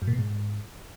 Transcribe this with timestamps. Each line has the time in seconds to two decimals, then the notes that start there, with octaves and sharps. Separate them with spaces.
0.02 F#2
0.07 A#2
0.13 B2
0.19 G#2